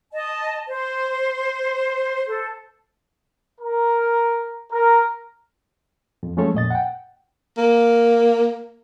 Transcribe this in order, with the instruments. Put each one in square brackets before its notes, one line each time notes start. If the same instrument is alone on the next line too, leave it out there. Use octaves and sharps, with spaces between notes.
[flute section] D#5 A5
C5
A4 C5
[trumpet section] A#4
A#4
[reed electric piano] F2
F3 G#3 A3 C#4 A4 C#5
F2 A#2 D#5 A6
F#5 G5
[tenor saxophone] A#3